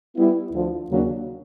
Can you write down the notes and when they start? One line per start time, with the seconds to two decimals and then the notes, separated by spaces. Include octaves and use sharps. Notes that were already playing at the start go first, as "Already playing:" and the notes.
0.16 G3 B3 E4
0.52 D2 D3 F3
0.89 D#2 C#3 F#3 A#3 D4